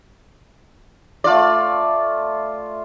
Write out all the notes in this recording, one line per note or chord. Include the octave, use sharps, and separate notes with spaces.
A3 F4 D5 E6